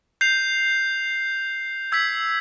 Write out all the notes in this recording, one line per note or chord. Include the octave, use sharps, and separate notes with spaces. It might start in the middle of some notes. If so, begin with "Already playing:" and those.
G6 C7 F7
E6 G#6 B6